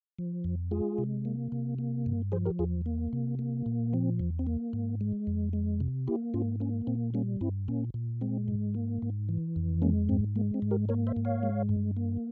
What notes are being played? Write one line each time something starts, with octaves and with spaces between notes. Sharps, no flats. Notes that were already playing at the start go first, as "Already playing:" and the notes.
F3
F2
G#3 F4 G#4
C3
A#3
C3
A#3
G2
F3 G#4 C5
G4 A#4
E2 F4 G#4
A#3
C3
A#3
A#2
F3 C4
E2
C4
A#3
G#2
G#3
F2
G#3
C3
A#3 E4 G4
G#2 C#4 F4
A#3 C#4
A#2 C4
G3 A#3 C#4
G2 C4 E4
A#2 A#3 C#4
A#2
G#3 C4
G#2
A#3
G#2
E3
F2
G#3 A#3 C#4
G#2 C4
G#3 A#3
C4
G#2
G4 A#4
A#3 A#4 C#5
C5 E5
G#2
C#5 F5
G#3
G2
A#3